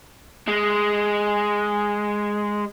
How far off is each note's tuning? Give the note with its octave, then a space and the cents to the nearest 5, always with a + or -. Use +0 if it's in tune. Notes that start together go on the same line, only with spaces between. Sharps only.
G#3 -5